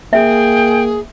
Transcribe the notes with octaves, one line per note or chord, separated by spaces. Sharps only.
A#3 G#4 E5 G5